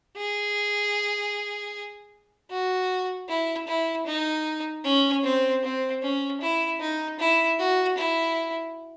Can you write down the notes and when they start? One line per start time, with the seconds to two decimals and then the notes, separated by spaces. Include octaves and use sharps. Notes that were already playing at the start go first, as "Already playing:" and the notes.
0.17 G#4
2.51 F#4
3.29 E4
3.68 E4
4.07 D#4
4.85 C#4
5.24 C4
5.63 C4
6.03 C#4
6.41 E4
6.81 D#4
7.20 E4
7.59 F#4
7.98 E4